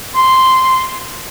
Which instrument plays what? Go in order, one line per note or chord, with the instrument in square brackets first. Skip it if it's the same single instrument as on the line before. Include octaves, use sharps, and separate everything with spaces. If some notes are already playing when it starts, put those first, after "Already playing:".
[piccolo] C6